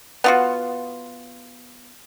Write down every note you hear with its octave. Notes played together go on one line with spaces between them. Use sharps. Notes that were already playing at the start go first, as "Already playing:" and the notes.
B3 F4 F#4